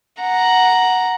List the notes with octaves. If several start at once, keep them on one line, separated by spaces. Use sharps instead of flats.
F#5 A#5